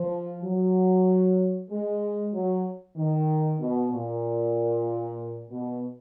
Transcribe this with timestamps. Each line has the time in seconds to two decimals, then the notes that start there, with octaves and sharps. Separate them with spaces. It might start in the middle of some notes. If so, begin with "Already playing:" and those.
Already playing: F3
0.43 F#3
1.70 G#3
2.33 F#3
2.97 D#3
3.60 B2
3.92 A#2
5.50 B2